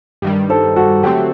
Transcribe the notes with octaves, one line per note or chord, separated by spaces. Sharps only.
G2 D#3 G3
A4 C5
F#4 A4
D3 F#3 A3 C4 G4